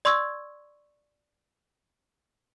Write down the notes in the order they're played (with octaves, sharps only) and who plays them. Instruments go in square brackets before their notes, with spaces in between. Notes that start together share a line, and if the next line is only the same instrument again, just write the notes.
[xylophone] D5 C6 C#6 E6 G#6